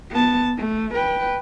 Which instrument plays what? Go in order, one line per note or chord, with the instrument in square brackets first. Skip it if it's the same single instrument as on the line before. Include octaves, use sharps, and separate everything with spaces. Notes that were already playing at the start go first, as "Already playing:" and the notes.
[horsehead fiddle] B3 A5
A3
B4 G5